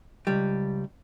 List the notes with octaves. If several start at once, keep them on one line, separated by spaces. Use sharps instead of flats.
C#2 G3